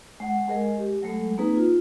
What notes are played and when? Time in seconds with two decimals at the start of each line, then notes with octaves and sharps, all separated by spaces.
0.20 G#3 F#5
0.48 G#3 G#4 A#4 D#5 G#5
0.78 G4
1.02 F#3 G#3 A3 A4
1.38 A#3 C4 D#4 G#4 B4
1.56 F4